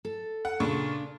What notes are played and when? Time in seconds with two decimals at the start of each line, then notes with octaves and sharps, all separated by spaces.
0.05 A4
0.45 F#5
0.60 A#2 C#3 D4 C#6